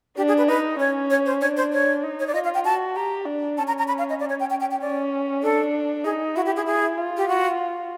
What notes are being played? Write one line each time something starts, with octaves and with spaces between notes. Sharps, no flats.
D4 G4
G#4
B4
D#4 B4
C#4 C#5
C#5
C5
D4 C#5
C5
C#5
D#4
C#5
D5
F4 D#5
F5
G5
F#4 A5
G4 A#5
D4
C#4 A5
A#5
A#5
B5
F5
D#5
D5
C#5
G5
G5
G5
G5
C#4 D5
D4 A4
D#4 G#4
E4 F#4
G4
G#4
G#4
F4
G4
F#4